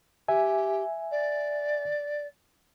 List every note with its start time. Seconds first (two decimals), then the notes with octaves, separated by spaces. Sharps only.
0.28 G4 E5 G#5
1.11 D5